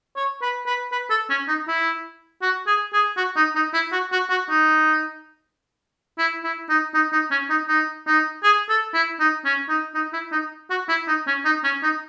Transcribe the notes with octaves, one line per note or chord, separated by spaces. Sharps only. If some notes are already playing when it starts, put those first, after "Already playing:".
C#5
B4
B4
B4
A4
C#4
D#4
E4
F#4
G#4
G#4
F#4
D#4
D#4
E4
F#4
F#4
F#4
D#4
E4
E4
D#4
D#4
D#4
C#4
D#4
D#4
D#4
G#4
A4
E4
D#4
C#4
D#4
D#4
E4
D#4
F#4
E4
D#4
C#4
D#4
C#4
D#4